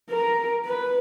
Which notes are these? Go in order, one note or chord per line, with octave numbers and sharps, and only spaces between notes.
A#4
B4